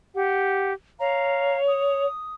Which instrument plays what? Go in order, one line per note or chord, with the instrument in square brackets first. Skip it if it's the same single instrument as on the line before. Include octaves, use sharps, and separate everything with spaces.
[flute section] G4 F#5
[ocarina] C#5 [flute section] F5 A#5
[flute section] D#6